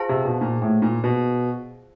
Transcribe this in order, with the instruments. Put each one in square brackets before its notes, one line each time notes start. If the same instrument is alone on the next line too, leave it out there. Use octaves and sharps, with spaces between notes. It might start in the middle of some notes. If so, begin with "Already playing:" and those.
Already playing: [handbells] F4 G#4 C5 F5 A5
[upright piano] C3
B2
A#2
A2
A#2
B2